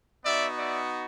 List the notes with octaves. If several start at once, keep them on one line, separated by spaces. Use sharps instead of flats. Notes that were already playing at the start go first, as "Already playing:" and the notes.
B3 D#4 F#4 D5 E5
D5 E5